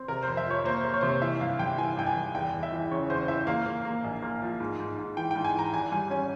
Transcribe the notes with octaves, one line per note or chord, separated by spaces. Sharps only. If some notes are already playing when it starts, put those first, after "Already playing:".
Already playing: C4
C3 A#4
C5
F2
E5
F3 C#5
A#3 C5
A#3
C#5
C3 C5
C#5
E3 E5
G1 F5
G1 G5
E3 G#5
G1 G5
G#5
G1
E2 G5
E2
E5
E3
C#3 C#5
E2 C5
E3 E5
A#3 F5
A#3
A#3
A#1
A#3
F3
G#2
G#2
G#2
E3 G5
G5
G#2
G#5
E3 A#5
G#1 G#5
G3 G#5
C#4 G#5